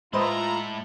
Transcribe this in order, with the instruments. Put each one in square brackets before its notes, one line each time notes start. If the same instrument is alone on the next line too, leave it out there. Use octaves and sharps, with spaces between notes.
[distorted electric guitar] A2 E4 [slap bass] G#3 [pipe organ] F4 A#5 [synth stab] B4 C5 D#5